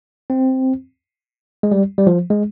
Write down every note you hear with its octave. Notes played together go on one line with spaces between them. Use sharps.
C4
G#3
G3
G3
F3
G#3